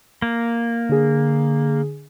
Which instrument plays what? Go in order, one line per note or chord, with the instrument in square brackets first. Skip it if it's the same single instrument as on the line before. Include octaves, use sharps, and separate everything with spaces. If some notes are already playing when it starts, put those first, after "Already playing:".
[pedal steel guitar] A#3
[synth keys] D3 G#4